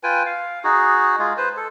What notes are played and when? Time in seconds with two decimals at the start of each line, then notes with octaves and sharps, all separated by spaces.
0.03 F4 B4 G5 G#5
0.26 F5
0.64 D#4 F#4 G#4
1.19 G#3 F4 G#4
1.37 B4 C5
1.57 A4